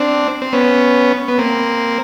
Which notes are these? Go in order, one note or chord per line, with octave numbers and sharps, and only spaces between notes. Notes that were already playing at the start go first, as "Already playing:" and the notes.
Already playing: C4 D4
C4
B3 C#4
B3
A#3 C4